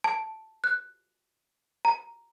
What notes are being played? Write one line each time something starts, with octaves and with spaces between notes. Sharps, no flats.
A5
F#6
A#5